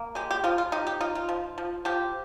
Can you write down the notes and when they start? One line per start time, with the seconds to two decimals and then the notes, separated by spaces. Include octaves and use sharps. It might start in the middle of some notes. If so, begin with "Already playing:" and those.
Already playing: A#3
0.15 G#3 G4
0.31 G4
0.44 F3 F4
0.58 F4
0.72 D#4 G4
0.87 G4
1.00 D#4 F4
1.15 F4
1.29 F3
1.58 F3
1.85 F3 G4